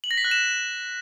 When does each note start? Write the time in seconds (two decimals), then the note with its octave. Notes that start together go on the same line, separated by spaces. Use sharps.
0.04 F#7
0.11 A#6
0.18 B6
0.24 F#6
0.31 E7